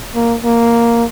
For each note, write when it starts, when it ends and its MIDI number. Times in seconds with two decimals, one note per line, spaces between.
0.15 0.37 58
0.44 1.05 58